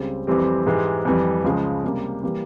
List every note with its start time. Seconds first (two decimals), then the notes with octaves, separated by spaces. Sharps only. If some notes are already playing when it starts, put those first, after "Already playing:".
Already playing: C#2 C#3 G3 C4
0.27 F2 E3 G3 C4 G4
0.66 G#2 E3 G#3 E4 G4
1.05 F2 E3 G3
1.44 C#2 C#3 F3 G#3
1.84 C#2 C3 G3 A#3
2.23 E3 G3 A#3